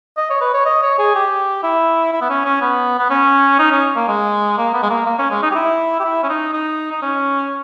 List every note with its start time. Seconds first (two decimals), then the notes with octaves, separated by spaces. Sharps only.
0.17 D#5
0.30 C#5
0.41 B4
0.54 C#5
0.66 D#5
0.83 C#5
0.99 G#4
1.15 G4
1.63 E4
2.13 E4
2.21 B3
2.30 C#4
2.45 C#4
2.61 B3
2.99 B3
3.10 C#4
3.59 D#4
3.71 C#4
3.96 A#3
4.08 G#3
4.57 A#3
4.74 B3
4.83 G#3
4.90 A#3
5.06 A#3
5.19 C#4
5.31 G#3
5.42 D#4
5.51 G4
5.55 E4
6.00 G4
6.04 E4
6.23 C#4
6.29 D#4
6.53 D#4
6.92 D#4
7.02 C#4